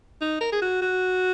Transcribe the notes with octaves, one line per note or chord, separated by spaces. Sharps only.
D#4
A#4
G#4
F#4
F#4